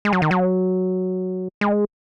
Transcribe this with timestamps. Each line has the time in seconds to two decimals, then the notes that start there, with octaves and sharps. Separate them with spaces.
0.05 G#3
0.13 F#3
0.22 D#3
0.31 F#3
1.61 G#3